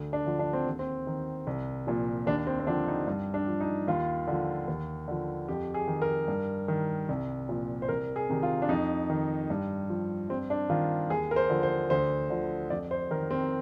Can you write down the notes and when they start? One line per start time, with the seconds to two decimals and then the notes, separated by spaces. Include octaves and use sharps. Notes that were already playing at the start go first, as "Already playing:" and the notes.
Already playing: D2
0.13 D4
0.26 D3 F3
0.39 D4
0.53 C4
0.66 D#2
0.79 C4
1.07 D#3
1.47 C2
1.87 A#2 F3
2.26 D#2 D4
2.47 C4
2.60 C4
2.66 D3 F3 D4
2.88 D#4
3.07 G2
3.34 D4
3.48 F3
3.60 D#4
3.87 D#2 F4
4.27 D3 F3
4.67 D#2
5.08 D3 F3
5.48 F2 G4
5.74 G#4
5.88 D#3
6.02 A#4
6.28 G2
6.68 D#3
7.09 C2
7.49 A#2 F3
7.82 C5
7.89 C2 A#4
8.16 G#4
8.29 C3 D#3
8.43 F4
8.62 D4
8.69 F2 D#4
9.10 D#3
9.50 G2
9.90 F3
10.29 G2 C4
10.50 D4
10.69 D#3 F4
11.10 D#2 G#4
11.31 A#4
11.36 C5
11.50 D3 F3
11.63 C5
11.90 D2 C5
12.30 D3 F3
12.70 F2 D5
12.91 C5
13.11 D#3 A#4
13.31 C4